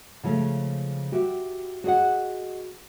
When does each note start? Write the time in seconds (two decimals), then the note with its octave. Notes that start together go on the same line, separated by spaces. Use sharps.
0.24 C#3 F3 G#3 A3
1.12 F#4 G4 E5
1.84 F#4 G#4 D#5 F#5